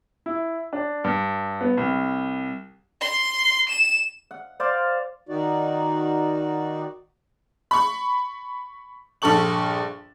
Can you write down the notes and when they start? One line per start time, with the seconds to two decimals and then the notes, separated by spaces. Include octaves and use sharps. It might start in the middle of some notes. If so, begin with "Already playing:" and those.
0.26 E4
0.73 D4
1.04 G2
1.61 B3
1.77 C2
3.01 C6
3.69 E7
4.31 F#5
4.60 C5 D5 F5 C6
5.29 D#3 D#4 F#4 D5
7.71 B5 C#6
9.22 A#1 G2 A4 C#6 F#7